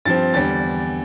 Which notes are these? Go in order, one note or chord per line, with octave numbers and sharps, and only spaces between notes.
G2 F3 C4 A6
E2 D3 G3 A6